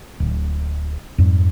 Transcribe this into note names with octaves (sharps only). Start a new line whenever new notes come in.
D1
F2 G#2 G3